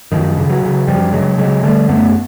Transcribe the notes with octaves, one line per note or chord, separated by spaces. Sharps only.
F#2 D#3 F3
C#3
E3 F#3
C#3
F#2 F3 G3
C#3 F#3 G#3
C#3 F#3 G#3
D3 G3 A3
F#2 A3 B3